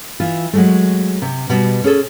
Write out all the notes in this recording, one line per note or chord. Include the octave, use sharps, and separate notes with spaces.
E3 F4
F#3 G#3 A3
C3
B2 G3
C#4 G#4 A4